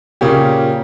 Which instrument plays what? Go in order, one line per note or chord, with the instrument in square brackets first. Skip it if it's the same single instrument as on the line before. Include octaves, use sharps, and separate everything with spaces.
[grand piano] A#2 C#3 A#3 C#4 G4